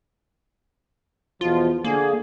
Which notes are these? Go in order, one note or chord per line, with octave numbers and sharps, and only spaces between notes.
E2 B2 F3 F4
D3 A#3 G#4